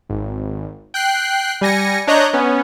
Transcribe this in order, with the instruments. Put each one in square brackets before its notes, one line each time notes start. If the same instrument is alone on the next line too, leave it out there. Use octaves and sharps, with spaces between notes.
[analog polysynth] G#1
G5 F#6 C7
G3 G#5 A#6 C#7
D4 C#5 D#5 A#5 F#6 G6
B3 C#4